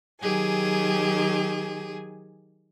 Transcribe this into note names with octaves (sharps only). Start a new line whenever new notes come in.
D#3 F#3 G4 G#4 G#5